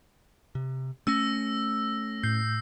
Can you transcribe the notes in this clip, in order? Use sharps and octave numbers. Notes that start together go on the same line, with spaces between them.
C3
A3 C#4 E6 A#6
A2 G6 C7